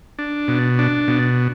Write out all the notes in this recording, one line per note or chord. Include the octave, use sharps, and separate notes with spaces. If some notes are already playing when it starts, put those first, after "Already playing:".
D4
B2
D4
B2